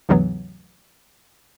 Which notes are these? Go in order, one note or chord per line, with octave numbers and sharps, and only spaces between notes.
D2 G2 C3 E3 F#3 B3